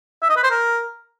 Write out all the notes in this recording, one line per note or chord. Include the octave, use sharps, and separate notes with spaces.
E5
D#5
B4
C5
A#4